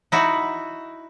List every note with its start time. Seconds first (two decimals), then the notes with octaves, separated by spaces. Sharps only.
0.12 D#4 E4 F#4